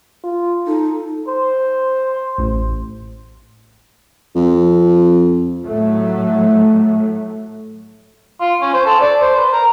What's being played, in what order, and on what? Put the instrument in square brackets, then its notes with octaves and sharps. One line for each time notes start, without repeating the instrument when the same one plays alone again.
[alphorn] F4
[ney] D#4 [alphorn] A4
[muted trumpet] C5
[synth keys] A1
[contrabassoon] F2
[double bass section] A2 F#3 A3
[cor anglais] F4
C#4
C5
A4
D5
C5
B4
A#4